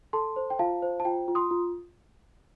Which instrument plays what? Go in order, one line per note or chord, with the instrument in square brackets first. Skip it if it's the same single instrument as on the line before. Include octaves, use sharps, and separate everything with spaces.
[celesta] A4 A5 C6
C5
G5
F4 F5 A5
C5
A5
F4 G5
F4
C6 D#6
F4